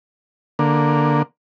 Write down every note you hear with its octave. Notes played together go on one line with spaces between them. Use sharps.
D3 A#3